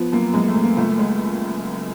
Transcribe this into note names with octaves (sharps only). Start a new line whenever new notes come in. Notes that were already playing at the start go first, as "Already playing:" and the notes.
Already playing: F3 B3
F#2 A#3
F#2 G#3
A3
F#2
A#3
C#2 A3
G#3